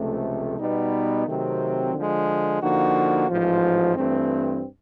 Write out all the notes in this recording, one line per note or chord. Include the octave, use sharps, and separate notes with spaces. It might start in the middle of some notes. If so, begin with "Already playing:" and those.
Already playing: C#2 C3 F3 A3
B2 G3 B3 D#4
C3 D#3 F#3 A3 C4
D3 F3 G#3
D3 F3 A#3 D#4 F#4
A1 G#2 F3
G2 E3 A3 C4